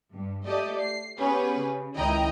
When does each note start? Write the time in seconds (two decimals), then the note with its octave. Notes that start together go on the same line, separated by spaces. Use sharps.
0.13 G2
0.47 A3 G4 A4 D5 D#5
0.82 C7
1.17 B3 C#4 G4 G#4 B4
1.61 C#3
1.96 C#2 D#3 E4 D#5 G5 A#5